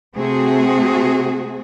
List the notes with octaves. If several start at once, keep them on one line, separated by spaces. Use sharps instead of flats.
C3 A3 C4 F#4 G#4